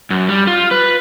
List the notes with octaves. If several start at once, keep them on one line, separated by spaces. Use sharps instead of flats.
F#2
G3
F4
B4